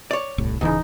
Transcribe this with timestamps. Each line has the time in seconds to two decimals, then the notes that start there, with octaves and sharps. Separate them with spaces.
0.11 C#5 D5
0.38 D#1 C2 A2
0.61 D1 D2 C#3 E3 D#4